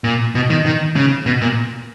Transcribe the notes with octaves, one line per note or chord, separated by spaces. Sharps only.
A#2
B2
D#3
D#3
C#3
B2
A#2